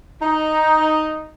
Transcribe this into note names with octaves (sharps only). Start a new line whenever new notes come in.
D#4